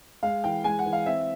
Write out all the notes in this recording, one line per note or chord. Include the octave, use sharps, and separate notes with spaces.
G#3 F5
E3 G5
G#3 G#5
F#5
E3
F5
C4 E5